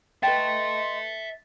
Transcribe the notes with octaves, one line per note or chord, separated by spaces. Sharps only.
B4 D#5 E5 G5 A5 C6 A6